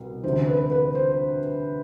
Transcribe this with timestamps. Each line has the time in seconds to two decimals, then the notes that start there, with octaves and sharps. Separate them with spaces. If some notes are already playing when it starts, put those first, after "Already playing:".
Already playing: C2 B2
0.23 D2 C3 E3 C5
0.47 B4
0.71 B4
0.95 C5